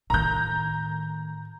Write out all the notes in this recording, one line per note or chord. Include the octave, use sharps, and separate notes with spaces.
A2 D#3 A#5 G6